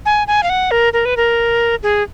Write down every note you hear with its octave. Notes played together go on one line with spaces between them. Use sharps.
G#5
G#5
F5
F#5
A#4
A#4
B4
A#4
G#4